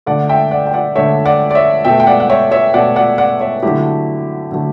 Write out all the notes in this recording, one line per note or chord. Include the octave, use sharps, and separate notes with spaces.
D3 A3 D5 F#5
E5 G5
D5 F#5
G5
D5 F#5
D3 A3 C#5 E5
D5 F#5
D5
C#5 E5
B2 A3 E5 G5
G5
D5 F#5
F#5
C#5 E5
C#5 E5
B2 A3 D5 F#5
D5 F#5
D5 F#5
C#5 E5
D3 F#3 A3 E4 G4
D3 F#3 A3